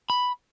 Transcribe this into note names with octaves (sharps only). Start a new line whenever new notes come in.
B5